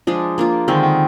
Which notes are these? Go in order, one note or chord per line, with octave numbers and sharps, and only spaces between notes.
F3 G#3 D4 G#4
A#3 D4 F4
D3 D#3 G#3 C4
D#3